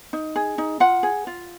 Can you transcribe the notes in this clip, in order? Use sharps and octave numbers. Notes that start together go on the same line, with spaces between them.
D#4
G#4
D#4
F4 F#5
G#4
F4